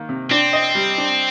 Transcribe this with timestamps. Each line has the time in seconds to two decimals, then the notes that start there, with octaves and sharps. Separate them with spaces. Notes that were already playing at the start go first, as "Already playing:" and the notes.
Already playing: D#3 A#3
0.09 C3
0.30 C4 D4
0.53 D#5
0.75 G3
0.98 D4